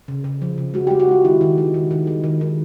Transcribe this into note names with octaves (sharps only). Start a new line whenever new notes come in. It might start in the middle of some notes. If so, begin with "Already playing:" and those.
C#3
C#3
F3
C#3
G#3 F#4
G#3 G4
F#4
G#3 F4
D#3 E4
D#3
G#3
D#3
D#3
G#3
D#3
D#3